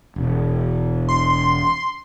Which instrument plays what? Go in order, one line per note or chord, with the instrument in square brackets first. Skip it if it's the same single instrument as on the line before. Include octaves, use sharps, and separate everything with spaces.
[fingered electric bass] E1
[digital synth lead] C6